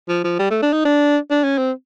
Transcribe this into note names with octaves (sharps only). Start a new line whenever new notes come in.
F3
F3
G3
A3
D4
D#4
D4
D4
C#4
C4